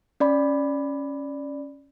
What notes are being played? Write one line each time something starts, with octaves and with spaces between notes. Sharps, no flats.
C#4 D5 B5